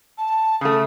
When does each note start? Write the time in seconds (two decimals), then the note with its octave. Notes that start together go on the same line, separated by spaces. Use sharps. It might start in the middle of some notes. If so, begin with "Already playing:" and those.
0.18 A5
0.61 C#3 A3 D#6